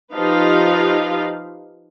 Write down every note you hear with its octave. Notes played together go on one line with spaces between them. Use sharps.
F3 D#4 F4 G4 B4 F5